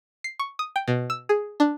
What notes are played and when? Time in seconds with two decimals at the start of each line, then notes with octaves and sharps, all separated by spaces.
0.24 C7
0.39 C#6
0.59 D#6
0.76 G5
0.88 B2
1.10 E6
1.29 G#4
1.60 D4